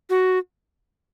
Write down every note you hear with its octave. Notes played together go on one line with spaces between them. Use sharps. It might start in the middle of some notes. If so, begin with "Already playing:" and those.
F#4